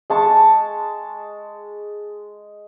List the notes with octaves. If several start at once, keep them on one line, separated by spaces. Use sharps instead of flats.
G#3 A5 C#6